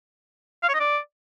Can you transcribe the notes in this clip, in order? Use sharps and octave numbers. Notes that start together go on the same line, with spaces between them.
F5
C#5
D#5
D5